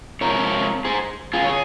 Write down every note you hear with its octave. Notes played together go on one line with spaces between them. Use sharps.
C3 F3 G#3 A#4 C#5
G#4 C5
F4 G#4
C#5
G#4